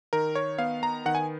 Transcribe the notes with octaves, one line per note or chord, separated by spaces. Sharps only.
D#3 A#4
C#5
B3 F5
A#5
D#3 F#5
G#5